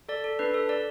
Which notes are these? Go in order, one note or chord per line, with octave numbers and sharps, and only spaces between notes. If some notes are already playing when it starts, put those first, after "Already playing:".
A4 D5
A4
D4 B4
A4
A4 D5